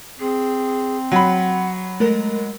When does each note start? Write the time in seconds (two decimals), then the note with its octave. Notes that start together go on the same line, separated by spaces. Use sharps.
0.20 C4 G#4
1.12 F#3 F#5 B5
2.00 G#3 A3 A#4